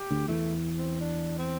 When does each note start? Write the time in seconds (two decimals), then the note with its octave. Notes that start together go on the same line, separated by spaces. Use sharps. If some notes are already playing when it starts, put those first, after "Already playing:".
Already playing: G4
0.11 D2 D3
0.28 E2 E3 A3
0.77 C4
1.01 D4
1.38 C4